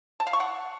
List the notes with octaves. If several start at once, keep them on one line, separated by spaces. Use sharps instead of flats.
A5
F5
C#6
F#5